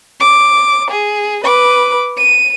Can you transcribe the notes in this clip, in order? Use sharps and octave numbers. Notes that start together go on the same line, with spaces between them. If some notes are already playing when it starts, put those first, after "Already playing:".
D6
G#4
B4 D6
D#7